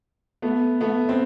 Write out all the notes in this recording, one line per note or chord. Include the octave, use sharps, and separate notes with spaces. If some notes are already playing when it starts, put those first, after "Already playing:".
A3 B3
A3 B3
C4